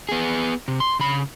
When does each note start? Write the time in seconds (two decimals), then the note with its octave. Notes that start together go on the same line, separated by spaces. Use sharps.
0.09 B3 G#4
0.68 C3
0.80 C6
0.99 C#3 B5